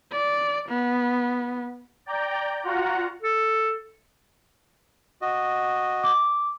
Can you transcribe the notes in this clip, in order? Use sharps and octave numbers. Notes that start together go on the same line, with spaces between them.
D5
B3
D5 G5 A#5 G6
F4 F#4 F#5 A#5
A4
F#4 D#5
D6